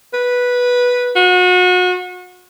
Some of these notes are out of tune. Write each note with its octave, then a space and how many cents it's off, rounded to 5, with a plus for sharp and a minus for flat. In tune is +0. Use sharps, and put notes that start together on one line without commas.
B4 -10
F#4 -35